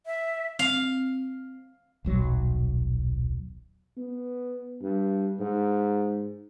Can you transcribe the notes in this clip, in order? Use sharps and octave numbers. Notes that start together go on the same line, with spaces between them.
E5
C4 F5
D#1 B1 F#3
B3
G2
G#2